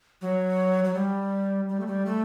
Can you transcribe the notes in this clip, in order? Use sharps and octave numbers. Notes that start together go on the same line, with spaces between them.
F#3
F#3
G3
G3
A3
G3
A3